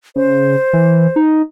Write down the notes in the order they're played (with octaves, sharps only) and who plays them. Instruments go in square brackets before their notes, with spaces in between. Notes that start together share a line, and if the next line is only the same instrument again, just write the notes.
[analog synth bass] C#3 [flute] C5
[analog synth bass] E3
D#4